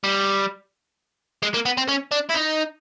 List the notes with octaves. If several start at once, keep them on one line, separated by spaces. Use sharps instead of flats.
G3
G#3
A#3
B3
C4
C#4
D4
E4
D#4